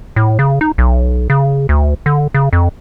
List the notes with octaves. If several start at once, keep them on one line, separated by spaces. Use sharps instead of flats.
A2
C#3
D#4
B1
C#3
D2
D3
C#3
F2